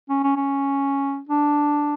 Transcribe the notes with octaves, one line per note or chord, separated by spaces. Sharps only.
C#4
C#4
C#4
D4